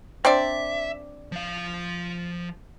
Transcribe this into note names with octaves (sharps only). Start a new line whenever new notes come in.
C4 D4 D5 E5
F3 F5